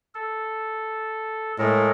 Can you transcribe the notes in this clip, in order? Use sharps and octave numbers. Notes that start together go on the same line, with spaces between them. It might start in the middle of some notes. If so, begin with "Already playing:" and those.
A4
A2 G#3 A4 A#4